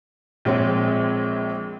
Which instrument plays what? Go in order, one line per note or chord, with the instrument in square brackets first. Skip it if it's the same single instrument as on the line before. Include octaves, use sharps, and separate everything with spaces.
[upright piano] A#1 G#3 C4 C#5